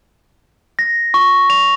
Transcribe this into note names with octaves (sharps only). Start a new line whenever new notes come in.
A#6
C#6
F7